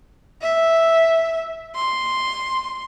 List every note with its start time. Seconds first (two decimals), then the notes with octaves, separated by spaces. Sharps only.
0.41 E5
1.75 C6